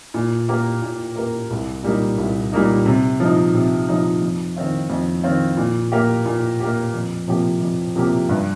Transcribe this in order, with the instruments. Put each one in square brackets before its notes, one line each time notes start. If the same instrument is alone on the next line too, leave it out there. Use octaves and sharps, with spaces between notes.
[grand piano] A#2
A#3 G4 A#4
A#2
A#3 G4 A#4
C2
A#2 G3 A#3 D#4
C2
A#2 G3 A#3 D#4
C3
F3 D#4
C3
F3 D#4
F2
D#3 C4 F4
F2
D#3 C4 F4
A#2
A#3 G4
A#2
A#3 G4
F2
C3 F3 A#3 G4
F2
C3 F3 A#3 G4
G2